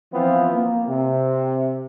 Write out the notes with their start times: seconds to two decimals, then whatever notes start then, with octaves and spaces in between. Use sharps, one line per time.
0.12 E3 F3 B3 C4 F4
0.51 A#3
0.87 C3